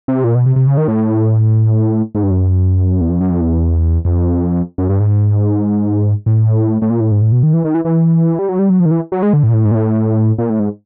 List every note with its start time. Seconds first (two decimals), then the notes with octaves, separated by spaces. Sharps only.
0.08 C3
0.24 A#2
0.35 B2
0.46 C3
0.56 C3
0.67 C#3
0.78 D#3
0.88 A2
2.15 G#2
2.23 G2
2.31 F#2
3.01 E2
3.10 F2
3.20 F#2
3.30 F2
3.41 E2
4.05 F2
4.78 F#2
4.89 G2
5.00 G#2
6.26 A2
6.82 A2
6.90 A#2
7.01 A2
7.11 G#2
7.22 A2
7.32 B2
7.43 D#3
7.54 E3
7.65 D#3
7.74 E3
7.85 E3
8.39 G3
8.49 F#3
8.59 G3
8.70 F#3
8.80 F3
8.86 D#3
8.91 E3
9.12 F#3
9.23 G#3
9.33 D3
9.43 A2
9.49 A#2
9.54 A2
9.65 G#2
9.71 A#2
9.75 A2
10.38 A#2
10.50 A2
10.59 G#2